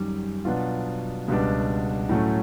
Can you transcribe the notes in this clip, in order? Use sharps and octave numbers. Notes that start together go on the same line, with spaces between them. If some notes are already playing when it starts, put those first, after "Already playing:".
Already playing: F#2 D#3 G3
B2 F#3 B3 D4 F4
C#2 B2 G3 B3 D4
A2 F#3 A3 C#4